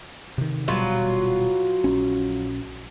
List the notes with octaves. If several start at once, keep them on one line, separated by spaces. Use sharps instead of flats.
C3 D#3
D#1 B2 F#3 G3 F4 B4
A#1 C#4